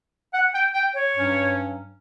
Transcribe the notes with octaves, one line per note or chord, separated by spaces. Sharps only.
F#5
G5
G5
C#5
G2 F#3 C#4